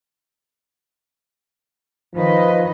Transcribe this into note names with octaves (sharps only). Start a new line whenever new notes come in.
D#3 F3 B4 D#5